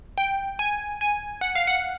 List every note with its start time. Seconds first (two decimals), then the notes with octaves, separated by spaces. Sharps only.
0.18 G5
0.59 G#5
1.01 G#5
1.41 F#5
1.55 F5
1.67 F#5